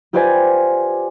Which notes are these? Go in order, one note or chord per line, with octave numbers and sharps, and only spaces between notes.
F4 G4 B4 C5 D5 G#5